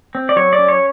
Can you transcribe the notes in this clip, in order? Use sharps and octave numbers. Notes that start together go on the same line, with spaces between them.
C4
D5
F#3 C#5
D5
C#4
C#5